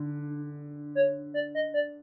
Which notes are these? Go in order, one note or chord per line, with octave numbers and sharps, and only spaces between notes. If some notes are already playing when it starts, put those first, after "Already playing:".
Already playing: D3
C#5
D5
D#5
D5